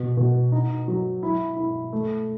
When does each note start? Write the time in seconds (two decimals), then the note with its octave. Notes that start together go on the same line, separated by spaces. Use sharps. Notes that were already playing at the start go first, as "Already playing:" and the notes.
Already playing: B2
0.17 B2
0.52 D#4
0.88 F#3
1.23 E4
1.57 E4
1.93 A3